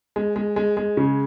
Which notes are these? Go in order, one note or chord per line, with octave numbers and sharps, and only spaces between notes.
G#3
G#3
G#3
G#3
C#3